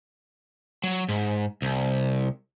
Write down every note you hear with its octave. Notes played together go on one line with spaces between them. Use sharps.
F#3
G#2
C2